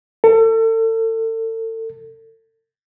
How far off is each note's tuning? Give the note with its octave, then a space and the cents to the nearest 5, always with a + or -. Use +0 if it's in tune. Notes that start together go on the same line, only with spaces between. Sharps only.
A4 +35